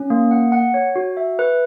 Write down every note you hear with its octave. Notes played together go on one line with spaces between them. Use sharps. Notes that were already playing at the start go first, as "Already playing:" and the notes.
Already playing: C#4
A#3
F#5
F#5
C#5
F#4
E5
B4